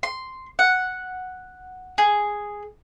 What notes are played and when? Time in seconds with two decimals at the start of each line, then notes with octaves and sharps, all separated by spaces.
0.03 C6
0.59 F#5
1.98 G#4